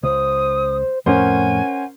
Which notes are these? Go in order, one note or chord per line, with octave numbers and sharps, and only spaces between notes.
C#2 C5 D#6
F2 A2 C#4 A#4 C5 F#5 G#5